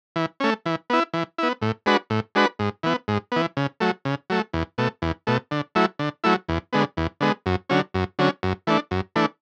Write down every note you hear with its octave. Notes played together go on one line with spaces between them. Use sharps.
E3
A3 C#4
E3
B3 E4
E3
B3 E4
A2
G#3 D4 F#4 B4
A2
G#3 D4 F#4 B4
G#2
E3 B3
G#2
E3 B3
C#3
F#3 A3
C#3
F#3 A3
E2
B2 A3
E2
B2 A3
D3
F#3 A3 E4
D3
F#3 A3 E4
E2
D3 G#3 B3
E2
D3 G#3 B3
F#2
D3 F#3 C#4
F#2
D3 F#3 C#4
F#2
E3 A3 D4
F#2
E3 A3 D4